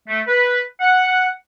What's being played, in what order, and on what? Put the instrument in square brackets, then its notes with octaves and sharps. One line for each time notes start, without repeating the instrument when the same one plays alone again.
[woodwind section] A3
B4
F#5